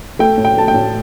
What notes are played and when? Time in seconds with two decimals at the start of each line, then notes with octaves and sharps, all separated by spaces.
0.19 A3 G5
0.37 A2
0.45 G5
0.57 A3 A5
0.68 G5
0.74 A2